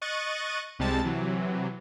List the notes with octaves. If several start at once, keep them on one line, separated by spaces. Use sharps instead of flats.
D#5 C#6 F#6 A6 D#7
C2 C3 G3 G#3 A5 A6
C3 E3 F#3